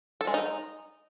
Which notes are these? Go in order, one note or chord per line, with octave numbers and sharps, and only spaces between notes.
A4
G#3
D#4